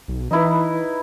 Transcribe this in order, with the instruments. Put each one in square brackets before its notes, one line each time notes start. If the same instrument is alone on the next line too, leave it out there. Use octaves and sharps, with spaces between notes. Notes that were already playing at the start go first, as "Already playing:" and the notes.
[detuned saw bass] B1
[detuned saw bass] E3 [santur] D#4 E4 B4